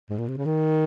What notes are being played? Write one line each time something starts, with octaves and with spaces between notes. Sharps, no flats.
G#2
A#2
C3
C#3
D#3